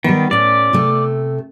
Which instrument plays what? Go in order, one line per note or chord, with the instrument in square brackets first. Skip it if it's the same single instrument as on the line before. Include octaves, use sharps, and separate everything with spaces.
[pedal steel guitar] D#3 [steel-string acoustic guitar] G3 B3
[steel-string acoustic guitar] A2 C#4 [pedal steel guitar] D5
[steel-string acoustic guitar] C3 A3